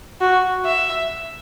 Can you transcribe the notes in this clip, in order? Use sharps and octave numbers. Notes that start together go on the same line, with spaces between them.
F#4
E5